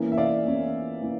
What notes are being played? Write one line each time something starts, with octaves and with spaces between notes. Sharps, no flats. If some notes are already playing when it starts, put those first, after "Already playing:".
Already playing: E2 E3 A#3 C#4
E5
D5 F5
E2 E3 A#3 C#4
E3 A#3 C#4